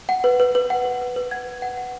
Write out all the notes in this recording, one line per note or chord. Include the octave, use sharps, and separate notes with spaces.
F#5
B4
B4
B4
F#5
B4
B4
B4
F#5 G#6
B4
F#5
F#5